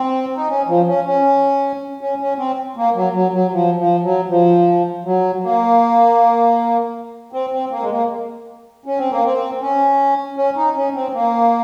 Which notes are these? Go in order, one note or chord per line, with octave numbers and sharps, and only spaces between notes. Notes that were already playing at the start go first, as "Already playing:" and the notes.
Already playing: C4
D#4
C#4
F3
C#4
C#4
C#4
C#4
C4
A#3
F#3
F#3
F#3
F3
F3
F#3
F3
F#3
A#3
C4
C4
A#3
G#3
A#3
C#4
C4
A#3
C4
C#4
C#4
D#4
C#4
C4
A#3